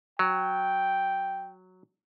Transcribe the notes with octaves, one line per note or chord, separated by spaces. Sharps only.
F#3 G5